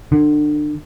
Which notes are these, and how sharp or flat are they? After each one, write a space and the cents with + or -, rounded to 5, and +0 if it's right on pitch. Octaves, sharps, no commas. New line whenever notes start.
D3 +30